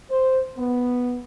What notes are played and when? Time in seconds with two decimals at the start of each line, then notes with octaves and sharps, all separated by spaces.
0.10 C5
0.57 B3